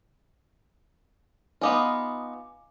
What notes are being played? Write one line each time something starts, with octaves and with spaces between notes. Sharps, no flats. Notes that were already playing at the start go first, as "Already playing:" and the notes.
B3 D#4 F4 F5 G#5 D6